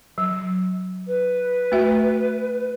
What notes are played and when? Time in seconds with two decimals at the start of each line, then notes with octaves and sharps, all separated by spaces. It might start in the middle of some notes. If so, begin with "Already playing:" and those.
0.18 F#3
1.07 B4
1.72 A3 F#4 E5